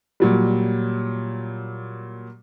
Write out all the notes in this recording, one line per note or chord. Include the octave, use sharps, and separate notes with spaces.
A#2 F#3 G3